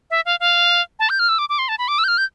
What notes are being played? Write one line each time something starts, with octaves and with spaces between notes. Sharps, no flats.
E5
F5
F5
A5
G6
F6
E6
D6
D6
C6
A5
B5
D6
E6
G6
F6
G6